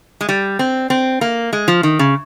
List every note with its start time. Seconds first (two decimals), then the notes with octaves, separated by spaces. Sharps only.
0.21 G#3
0.29 G3
0.59 C4
0.90 C4
1.21 A#3
1.53 G#3
1.68 F3
1.83 D#3
1.99 C#3